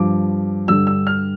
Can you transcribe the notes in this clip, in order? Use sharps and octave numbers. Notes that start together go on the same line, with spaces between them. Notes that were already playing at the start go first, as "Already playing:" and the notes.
Already playing: G2 F3 D6
G2 D3 G3 E6
E6
F6